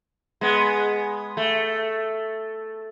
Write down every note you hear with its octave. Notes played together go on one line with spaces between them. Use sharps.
G#3 B3
A3